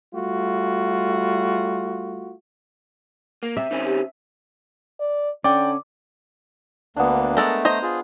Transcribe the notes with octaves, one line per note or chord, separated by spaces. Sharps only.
G3 A3 F4 F#4
A#3
C3 E5
D#3 C4 C#4
G4
D5
D3 C#4 D5 G5 D6
D2 A#3 B3 D4
G#3 A3 A4 A#4
C5 D#5 A#5
F4 G#4